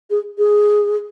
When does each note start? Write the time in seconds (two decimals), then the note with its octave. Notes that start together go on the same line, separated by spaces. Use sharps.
0.10 G#4
0.38 G#4